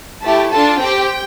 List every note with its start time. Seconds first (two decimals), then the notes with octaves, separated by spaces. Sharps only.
0.23 A3 E4 G4 A5
0.51 D4 F4 A4 A5
0.80 C4 G4 G5